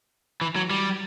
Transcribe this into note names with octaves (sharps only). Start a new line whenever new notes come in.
E3
F#3
G3